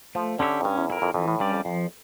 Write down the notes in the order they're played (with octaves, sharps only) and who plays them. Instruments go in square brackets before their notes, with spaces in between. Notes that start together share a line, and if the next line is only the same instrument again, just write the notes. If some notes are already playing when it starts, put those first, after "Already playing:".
[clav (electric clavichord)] F3 [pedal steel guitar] A3
[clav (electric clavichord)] D3 [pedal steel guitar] C#4 G4 C#5 E5
[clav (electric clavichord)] F2
[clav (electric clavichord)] G2 [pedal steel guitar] C#4
[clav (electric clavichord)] E2
[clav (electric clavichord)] F2 [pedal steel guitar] E4 A#4
[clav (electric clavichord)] F2
[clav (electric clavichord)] F2 [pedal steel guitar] E3
[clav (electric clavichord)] A2
[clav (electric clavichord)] G2 [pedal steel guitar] G3 C#4 G4 D5
[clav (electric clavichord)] F2
[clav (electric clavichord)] F2 [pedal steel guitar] F3